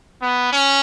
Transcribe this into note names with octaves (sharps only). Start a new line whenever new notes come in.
B3
C#4